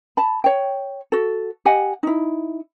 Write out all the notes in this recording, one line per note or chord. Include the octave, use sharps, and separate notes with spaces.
A5 B5
C#5 G5
F#4 A4
G4 D#5 F#5 G#5
D#4 E4